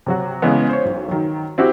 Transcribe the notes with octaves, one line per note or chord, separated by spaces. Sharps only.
C3 F#3 F#4
C#3 E3 G#3 B3
C5 C#5
B1
D#3 F#3
C4 E4 F#4 G4